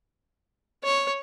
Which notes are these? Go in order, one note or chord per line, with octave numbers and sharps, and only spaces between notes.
C#5